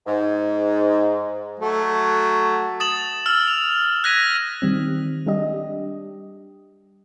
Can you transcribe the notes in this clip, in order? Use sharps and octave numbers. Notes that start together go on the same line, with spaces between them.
G#2
F#3 A3
D#6 A6 E7 F#7
E6 F6
F7
F#6 G#6 A#6 B6 D#7
D#3 G3 C4
G3 D4 G4 D#5